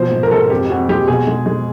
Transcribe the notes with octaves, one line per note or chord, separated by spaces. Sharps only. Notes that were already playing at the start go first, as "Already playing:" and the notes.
Already playing: B2 F3 C5
G#2
A#4
G#2 A4
F2 G4
F2 F#4
G#3 G4
B2 G#4
G#3
G#3